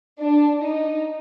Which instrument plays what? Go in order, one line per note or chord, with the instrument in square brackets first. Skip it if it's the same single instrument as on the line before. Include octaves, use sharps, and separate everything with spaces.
[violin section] D4
D#4